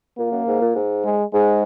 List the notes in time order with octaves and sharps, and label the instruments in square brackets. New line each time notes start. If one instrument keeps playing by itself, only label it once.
[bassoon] A#2 [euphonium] A#3
[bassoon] F#2
G#2
A#2
G#2
[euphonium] G#3
[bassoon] G#2 [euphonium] G#3